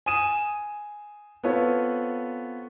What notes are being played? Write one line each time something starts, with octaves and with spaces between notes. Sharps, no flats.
G#5 D#6 D#7 E7
B3 C4 F4 A4 B4 C#5